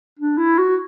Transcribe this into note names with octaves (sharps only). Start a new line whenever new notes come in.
D4
E4
F#4